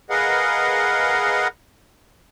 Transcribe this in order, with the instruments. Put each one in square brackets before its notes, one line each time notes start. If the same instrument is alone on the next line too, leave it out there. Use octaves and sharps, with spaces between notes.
[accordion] G#4 A#4 B4 D#5 F5 F#5